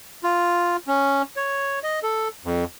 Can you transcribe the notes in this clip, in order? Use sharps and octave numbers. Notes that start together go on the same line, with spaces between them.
F4
C#4
C#5
D#5
A4
F2